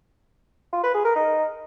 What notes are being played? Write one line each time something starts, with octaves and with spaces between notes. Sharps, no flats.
F4
B4
G#4
A#4
D#4